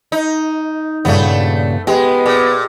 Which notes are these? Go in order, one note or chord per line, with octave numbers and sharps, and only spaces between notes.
D#4
G2 A#2 C#3 A3 B3
G#3 B3 G4
A#2